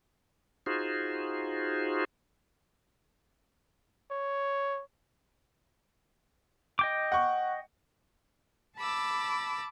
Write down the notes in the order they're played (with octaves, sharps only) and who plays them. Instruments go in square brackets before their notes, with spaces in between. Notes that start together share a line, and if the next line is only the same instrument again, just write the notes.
[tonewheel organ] D#4 F4 F#4 G#4 C5
[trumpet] C#5
[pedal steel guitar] D#5 G5 D6
[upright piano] F#5 C#6
[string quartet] A5 B5 D6 E6